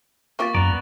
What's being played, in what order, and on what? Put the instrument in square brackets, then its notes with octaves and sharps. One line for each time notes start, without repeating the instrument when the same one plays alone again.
[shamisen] A#3 F4 G4 [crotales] C#6 A6
[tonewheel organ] F#2 A#5 [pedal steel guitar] B3 B4 D5